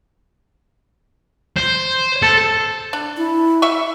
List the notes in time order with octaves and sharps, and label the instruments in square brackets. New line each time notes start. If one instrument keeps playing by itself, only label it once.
[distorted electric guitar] C5
A4
[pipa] D4
[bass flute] E4
[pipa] E5 C#6